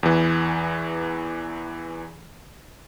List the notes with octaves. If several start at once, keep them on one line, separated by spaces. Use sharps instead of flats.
E2 E3